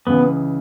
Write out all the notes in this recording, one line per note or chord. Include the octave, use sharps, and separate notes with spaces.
C#2 C#3 E3 B3